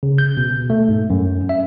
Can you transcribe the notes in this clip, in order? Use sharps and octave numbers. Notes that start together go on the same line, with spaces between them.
C#3
G6
B2
A3
G#2
F#2
E5